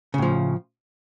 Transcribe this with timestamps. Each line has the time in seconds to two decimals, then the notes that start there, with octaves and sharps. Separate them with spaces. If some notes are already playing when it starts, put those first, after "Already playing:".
0.14 C#3
0.18 A2
0.22 F3